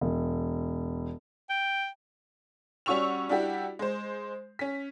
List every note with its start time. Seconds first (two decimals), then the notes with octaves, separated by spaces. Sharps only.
0.01 E1
1.50 G5
2.86 G3 C#4 F#4 C#6 E6 F7
3.29 G3 D4 E4 F#4 G4
3.79 G#3 C5
4.59 C#4 B6